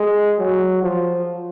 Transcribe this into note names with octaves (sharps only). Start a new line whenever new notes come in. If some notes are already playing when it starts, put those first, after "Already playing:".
Already playing: G#3
F#3
F3